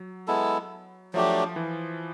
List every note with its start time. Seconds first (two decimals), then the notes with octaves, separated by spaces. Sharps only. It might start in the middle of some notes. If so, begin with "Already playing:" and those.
Already playing: F#3
0.27 G#3 B3 E4 A4
1.13 F3 F#3 A3 D4 G4
1.56 E3